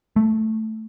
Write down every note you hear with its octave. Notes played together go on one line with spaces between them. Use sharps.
A3